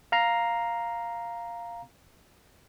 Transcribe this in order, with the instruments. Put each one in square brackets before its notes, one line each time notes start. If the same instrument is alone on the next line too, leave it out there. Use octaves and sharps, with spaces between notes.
[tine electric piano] F5 A#5 C7